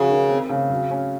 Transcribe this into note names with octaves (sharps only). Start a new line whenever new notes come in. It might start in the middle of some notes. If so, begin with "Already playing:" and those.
Already playing: C#3 F3 F#4
D#3
C4
C#3
F#3
C#4